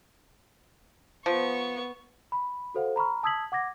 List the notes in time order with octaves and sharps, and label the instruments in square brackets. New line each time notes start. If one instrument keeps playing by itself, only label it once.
[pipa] F3 [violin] B3 C#6
[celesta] B5
F#4 A4 C5 F5 F#5
A#5 B5 C#6 F6
A5 D#6 E6 G#6 B6 F#7
F#5 D6 G#6 A#6